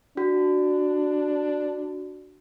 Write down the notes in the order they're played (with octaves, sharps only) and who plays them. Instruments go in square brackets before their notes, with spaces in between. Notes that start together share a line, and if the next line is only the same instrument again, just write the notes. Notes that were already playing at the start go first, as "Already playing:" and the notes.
[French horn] D4 [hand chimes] F#4